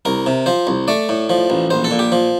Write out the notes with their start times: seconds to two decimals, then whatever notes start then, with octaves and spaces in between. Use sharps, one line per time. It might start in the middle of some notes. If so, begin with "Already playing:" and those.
0.05 C2 A#4
0.26 C3
0.46 F3 C5
0.67 C2
0.88 A3 D5
1.09 A2
1.30 F3
1.50 A1
1.70 A#1 C5
1.84 A4
1.91 A#2
1.99 G4
2.12 F3